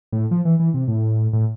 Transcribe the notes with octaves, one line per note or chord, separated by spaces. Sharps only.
A2
F3
E3
E3
C3
A2
A2